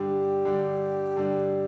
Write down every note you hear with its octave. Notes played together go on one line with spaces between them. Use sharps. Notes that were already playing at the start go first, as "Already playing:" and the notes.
Already playing: G2 D3 G3 D4 G4
G2 D3 G3 D4
G2 D3 G3 D4